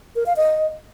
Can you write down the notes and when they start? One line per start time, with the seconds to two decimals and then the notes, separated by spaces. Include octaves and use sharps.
0.16 A#4
0.26 F5
0.37 D#5